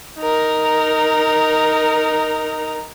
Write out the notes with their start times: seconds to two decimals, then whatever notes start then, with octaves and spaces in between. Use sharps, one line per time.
0.19 D#4 A#4